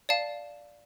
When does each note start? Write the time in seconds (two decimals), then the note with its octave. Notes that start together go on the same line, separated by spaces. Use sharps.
0.09 D5 F5 A5